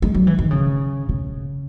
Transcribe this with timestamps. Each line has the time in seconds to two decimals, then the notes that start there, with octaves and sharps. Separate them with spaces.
0.02 G#3
0.14 F#3
0.27 E3
0.39 D#3
0.51 C#3
1.09 C#3